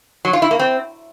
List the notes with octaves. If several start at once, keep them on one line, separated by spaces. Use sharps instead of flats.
F#3
F4
E4
A#3
C4